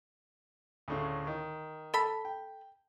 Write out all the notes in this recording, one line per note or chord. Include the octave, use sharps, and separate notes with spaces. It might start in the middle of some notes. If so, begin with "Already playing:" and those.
D2 A2 C#3
D#3
A4 B5
G5